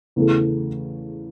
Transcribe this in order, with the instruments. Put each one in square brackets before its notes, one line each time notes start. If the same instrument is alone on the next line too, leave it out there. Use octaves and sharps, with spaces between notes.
[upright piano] E2 C#3 E3 A3